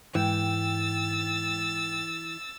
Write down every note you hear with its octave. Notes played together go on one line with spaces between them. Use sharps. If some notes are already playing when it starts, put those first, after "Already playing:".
G#2 E3 G5 E6 A6